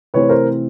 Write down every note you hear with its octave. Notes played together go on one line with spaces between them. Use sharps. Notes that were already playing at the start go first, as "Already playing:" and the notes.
C3 E3 A3 C4 B4 C#5
A#4 C5